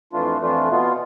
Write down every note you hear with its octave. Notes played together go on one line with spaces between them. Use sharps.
F2 E3 A3 D4 F4
F2 E3 A3 D4 F4
B2 B3 F4